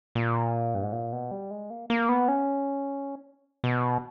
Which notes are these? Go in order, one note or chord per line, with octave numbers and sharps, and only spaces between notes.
A#2
G2
G#2
A#2
B2
G3
G#3
A#3
A#3
B3
C#4
B2